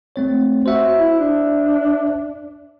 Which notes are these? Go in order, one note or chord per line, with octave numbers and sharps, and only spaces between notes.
A3 C4 C#5
F#4 C5 E5
E4
D4